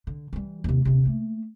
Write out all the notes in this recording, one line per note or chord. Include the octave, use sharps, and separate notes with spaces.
D3
E3 G3
D#2 C3
D#1 C3
A3 A#3